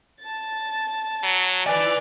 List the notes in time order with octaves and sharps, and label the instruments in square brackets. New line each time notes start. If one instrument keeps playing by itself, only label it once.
[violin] A5 A6
[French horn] F#3
[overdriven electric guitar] B4 G#5 [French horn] D5